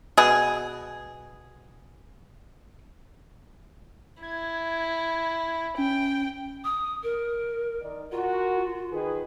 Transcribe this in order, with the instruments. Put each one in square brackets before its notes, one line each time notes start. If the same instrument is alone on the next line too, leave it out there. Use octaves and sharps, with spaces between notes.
[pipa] B2 G#4
[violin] E4 [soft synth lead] G#6
[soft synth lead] C#4 [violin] G5
[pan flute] D#6
A#4
[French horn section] D#3 D#4 D5
[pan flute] F4 [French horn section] F#4 A#4
[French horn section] D#3 G#4 B4